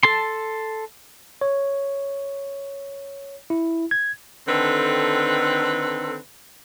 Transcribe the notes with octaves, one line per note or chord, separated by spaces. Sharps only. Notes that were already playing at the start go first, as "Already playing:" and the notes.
A4 A5 C6
C#5
E4
G#6
D3 D#3 C4 A4 B4